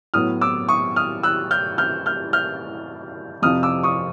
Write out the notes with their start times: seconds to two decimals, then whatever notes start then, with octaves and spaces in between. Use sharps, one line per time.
0.14 A2 F#3 B3 D#6 F6
0.41 D6 E6
0.69 C#6 D#6
0.96 D#6 F6
1.23 E6 F#6
1.51 F6 G6
1.78 F6 G6
2.06 F6 G6
2.33 F6 G6
3.42 F2 C3 F3 D#6 F6
3.63 D6 E6
3.83 C#6 D#6